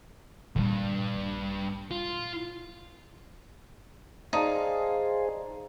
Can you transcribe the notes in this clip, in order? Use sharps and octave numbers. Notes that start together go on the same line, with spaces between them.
D2 G2 A#2 G3
A#1
F4
D#4 G#4 C5 D5 F5 A5